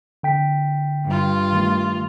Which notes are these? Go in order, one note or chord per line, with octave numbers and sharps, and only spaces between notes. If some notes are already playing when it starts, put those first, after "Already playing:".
D3 G5 B6
G2 F4
D#3 A3